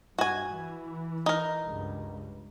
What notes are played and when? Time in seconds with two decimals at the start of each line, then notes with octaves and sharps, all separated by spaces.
0.18 G2 F#4 G#5
0.54 E3
1.26 D#4 A#4
1.65 C#2 G2